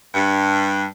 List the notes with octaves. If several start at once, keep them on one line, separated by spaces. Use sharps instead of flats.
G2